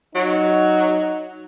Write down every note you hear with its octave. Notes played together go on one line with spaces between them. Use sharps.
F#3 D#4